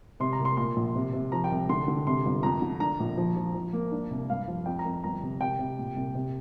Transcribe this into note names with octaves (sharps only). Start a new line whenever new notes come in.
C3 C6
A#5
C2
C6
A#2 C6
A#1
C3
C3
F3 A#5
G5
C2
D3 C6
D3
C3 C6
G1
F2 A#5
D3
D4 A#5
A#1
F3
F3
F3
A#3
D4
C2
G2 F5
F3
F2 G5
A#5
F2
G1 A#5
C3
C3 G5
C3
A#2
C2
C3